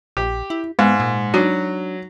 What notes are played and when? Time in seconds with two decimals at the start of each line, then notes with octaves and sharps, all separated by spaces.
0.17 A#1 G4
0.50 E4
0.79 G#2 G#3 B3
1.00 A#2
1.34 F#3 D4 D#4 F#4